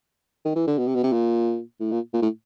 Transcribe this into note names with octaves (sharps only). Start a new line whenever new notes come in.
D#3
E3
D3
B2
C3
B2
C3
A#2
A2
A#2
A#2
A2